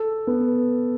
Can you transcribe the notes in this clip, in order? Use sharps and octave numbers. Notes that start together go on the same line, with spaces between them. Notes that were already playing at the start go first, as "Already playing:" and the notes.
Already playing: A4
B3